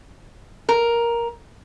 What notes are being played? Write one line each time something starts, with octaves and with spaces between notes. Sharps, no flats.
A#4